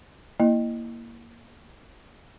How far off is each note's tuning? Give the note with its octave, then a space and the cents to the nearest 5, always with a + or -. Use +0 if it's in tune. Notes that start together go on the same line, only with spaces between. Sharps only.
A#3 +0 E4 +0 D#5 -15